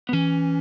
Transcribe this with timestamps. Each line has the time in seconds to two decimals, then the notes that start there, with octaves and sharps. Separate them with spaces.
0.09 B3
0.13 E3 C#4